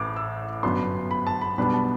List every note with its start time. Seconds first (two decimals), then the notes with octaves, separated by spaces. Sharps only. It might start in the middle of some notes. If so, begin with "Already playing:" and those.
Already playing: A1 A2 E3 D6
0.16 E6
0.63 G1 F#2 F#3 B3 D4 C6
1.11 B5
1.27 A5
1.41 B5
1.58 B1 B2 G3 B3 D4 B5
1.73 A5